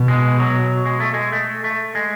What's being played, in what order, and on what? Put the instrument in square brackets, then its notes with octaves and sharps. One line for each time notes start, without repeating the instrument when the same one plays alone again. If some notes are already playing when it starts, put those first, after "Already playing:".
Already playing: [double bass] B2
[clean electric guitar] G#3
F#3
G#3
A3
G#3
A3
A3
G#3